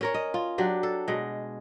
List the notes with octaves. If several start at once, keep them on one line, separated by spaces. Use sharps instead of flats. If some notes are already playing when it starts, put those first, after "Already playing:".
C#4 A#4 C#5
D#5
F4
F#3 D4 G4
A4
B2 G#3